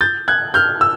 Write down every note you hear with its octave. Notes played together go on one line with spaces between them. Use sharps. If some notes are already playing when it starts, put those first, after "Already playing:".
G6 A6
F#6 G#6
F6 G6
E6